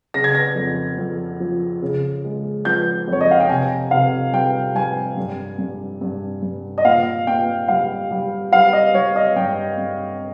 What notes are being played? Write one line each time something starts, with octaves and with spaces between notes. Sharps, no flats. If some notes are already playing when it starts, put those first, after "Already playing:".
C#3 A#6
G#6
A#6
F2
F2
F3
C#3
G#3
F3 G6
F2 C#5
D#5
F5
G5
C3 G#5
C3 F5
G3 G5
G3 G#5
G2
G2
G2
G2
D#5
A#2 F5
A#2 G5
G3 F5
G3
G3 F5
D#5
G3 C#5
D#5
G2 G5
G2